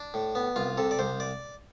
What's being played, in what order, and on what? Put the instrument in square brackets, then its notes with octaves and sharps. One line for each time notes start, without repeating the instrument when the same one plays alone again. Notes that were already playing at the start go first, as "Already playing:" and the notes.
Already playing: [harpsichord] D4
A2
B3
C2 F4
C3 A4
D5
C2 C5
D5